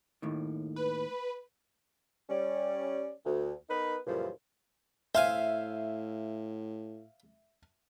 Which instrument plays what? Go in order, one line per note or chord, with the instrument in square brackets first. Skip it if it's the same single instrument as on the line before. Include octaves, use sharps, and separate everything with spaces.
[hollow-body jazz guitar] D#2 A2 D#3
[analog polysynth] B4
[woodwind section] G3 C#4 D5
D2
B3 D#4 A#4 B4
F#2 A#2 C#3 E3 F3 G3
[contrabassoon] A2 [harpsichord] C5 F5 G#5 [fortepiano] E5